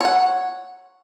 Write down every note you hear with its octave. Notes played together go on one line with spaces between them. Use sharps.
C#5 F#5